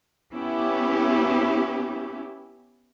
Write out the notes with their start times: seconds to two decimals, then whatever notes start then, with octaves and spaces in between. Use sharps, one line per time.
0.32 B3 C#4 E4 G4